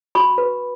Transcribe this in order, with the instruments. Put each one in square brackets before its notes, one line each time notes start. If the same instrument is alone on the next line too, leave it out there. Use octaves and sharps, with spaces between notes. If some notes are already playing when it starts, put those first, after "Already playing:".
[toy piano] F#4 B5 C#6
B4